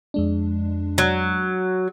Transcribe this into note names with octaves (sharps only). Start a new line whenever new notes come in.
F2 G#3 D4
F#3